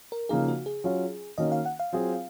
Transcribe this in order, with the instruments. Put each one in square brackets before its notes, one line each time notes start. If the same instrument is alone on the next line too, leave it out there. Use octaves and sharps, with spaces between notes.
[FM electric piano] A#4
[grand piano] C#3 F3 A#3 D#4 [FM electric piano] G#4
[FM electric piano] F#4
G#4
[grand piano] F#3 C#4 F4
[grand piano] D#3 A#3 C#4 F#4 [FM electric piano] D#5
[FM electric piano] F5
F#5
F5
[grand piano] F#3 C4 F4 G#4